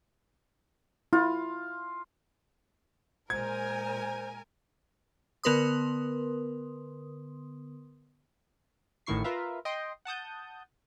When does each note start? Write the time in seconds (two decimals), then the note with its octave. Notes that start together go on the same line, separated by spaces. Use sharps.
1.13 E4 F4
3.30 A#2 G#3 A#4 C5 G#5 G#6
5.44 D3 B3 A#4 B4 C6 D#6
9.06 A1 A2 D#3 E4 C#6 C7
9.24 F4 A#4 B4 E5 F5
9.65 D#5 G5 C6
10.05 F#5 A5 D#6 G6